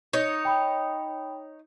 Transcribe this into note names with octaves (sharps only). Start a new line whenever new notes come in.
D#4 C#5
G5 B5 D#6